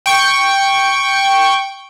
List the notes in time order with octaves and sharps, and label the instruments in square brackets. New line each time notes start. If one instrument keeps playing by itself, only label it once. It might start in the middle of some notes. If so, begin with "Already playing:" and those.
[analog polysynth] G5 C#6